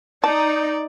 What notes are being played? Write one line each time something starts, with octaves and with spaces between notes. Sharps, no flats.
D#4 D5 A5